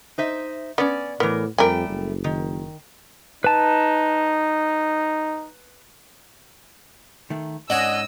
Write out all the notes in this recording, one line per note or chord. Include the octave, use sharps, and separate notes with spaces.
D#4 C5 E5
B3 C#4 D5
A2 E3 B3 A#4
F2 G3 A3 A#4 G5 G#5
F#1
D#3
D#4 B4 A5
D#3 A3
G#2 C#4 D4 D#5 F#5 G#5 E6